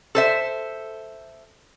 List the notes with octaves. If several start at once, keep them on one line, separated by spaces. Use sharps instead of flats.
A4 C5 E5